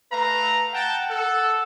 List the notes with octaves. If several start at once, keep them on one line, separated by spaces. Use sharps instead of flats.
A3 B4 F5 A#5
F#5 G5 A5
A4